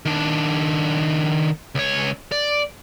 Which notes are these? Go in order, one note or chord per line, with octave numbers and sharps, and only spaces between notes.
D#3 D4
C#2 C#5
D5